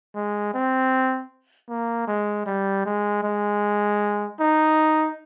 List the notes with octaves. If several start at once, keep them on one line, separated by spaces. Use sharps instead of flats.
G#3
C4
A#3
G#3
G3
G#3
G#3
D#4